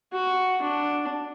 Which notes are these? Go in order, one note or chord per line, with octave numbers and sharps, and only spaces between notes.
F#4
D4